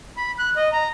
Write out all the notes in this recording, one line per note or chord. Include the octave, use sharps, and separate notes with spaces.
B5
F#6
D#5
A#5